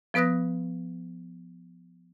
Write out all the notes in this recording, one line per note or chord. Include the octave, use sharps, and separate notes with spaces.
F3 B3 B4 D#6 F#6 A#6